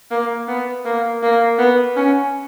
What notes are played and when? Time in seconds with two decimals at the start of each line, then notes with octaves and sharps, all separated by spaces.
0.11 A#3
0.48 B3
0.85 A#3
1.23 A#3
1.59 B3
1.96 C#4